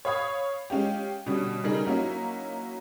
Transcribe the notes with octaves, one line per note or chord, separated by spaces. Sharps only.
C#5 F5 B5 D#6 G#6
G#3 C#4 F4 G4
B2 D3 G3 C#4
C#3 G3 A3 D#4 G#4 A#4
F#3 A#3 C#4 D#4 E4